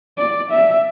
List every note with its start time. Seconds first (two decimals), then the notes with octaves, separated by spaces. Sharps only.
0.18 D5
0.51 E5